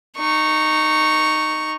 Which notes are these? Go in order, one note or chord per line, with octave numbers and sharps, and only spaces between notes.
D#4 C#6